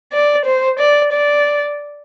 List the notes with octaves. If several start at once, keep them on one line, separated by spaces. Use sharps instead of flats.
D5
C5
D5
D5